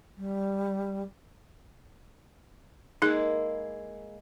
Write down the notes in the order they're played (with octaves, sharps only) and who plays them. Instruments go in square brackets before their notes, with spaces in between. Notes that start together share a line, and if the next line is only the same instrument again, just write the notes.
[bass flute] G3
[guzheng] G#3 A#3 E4 [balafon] D#4 G#4